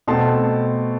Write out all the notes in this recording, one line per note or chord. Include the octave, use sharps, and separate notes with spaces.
B2 A3 C4 A5 C6